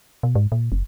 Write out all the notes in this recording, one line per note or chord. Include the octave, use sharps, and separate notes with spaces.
B2
G#2
A#2
F#1